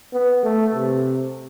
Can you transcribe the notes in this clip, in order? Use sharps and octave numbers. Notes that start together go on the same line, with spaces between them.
B3
A3
C3